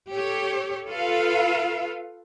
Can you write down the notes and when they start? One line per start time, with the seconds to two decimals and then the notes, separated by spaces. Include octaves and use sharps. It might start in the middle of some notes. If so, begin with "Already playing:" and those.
0.10 G4 A4 C#5
0.87 F4 A4 B4 F5